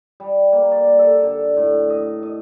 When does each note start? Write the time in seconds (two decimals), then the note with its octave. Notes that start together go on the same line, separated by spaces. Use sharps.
0.20 G3
0.53 A#3
0.71 D5
0.99 A4
1.23 D3
1.57 A2
1.90 D#5
2.23 D#5